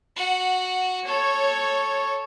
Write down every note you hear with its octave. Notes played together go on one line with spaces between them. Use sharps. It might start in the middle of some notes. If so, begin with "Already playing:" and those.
F#4 F#5
A4 C#5